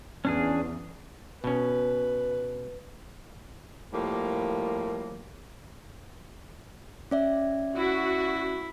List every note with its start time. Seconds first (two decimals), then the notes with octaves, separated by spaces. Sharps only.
0.25 E2 C#4 D4 G#4
1.44 B2 C#4 B4
3.93 A2 F3 G3 A#3
7.11 C#4 D5 E5
7.76 E4 F#4